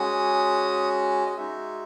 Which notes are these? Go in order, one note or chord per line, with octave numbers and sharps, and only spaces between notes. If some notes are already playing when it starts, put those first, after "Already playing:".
Already playing: G#3 C#4 F#4 D#6
D#5
G#3 D#4 F#4 E5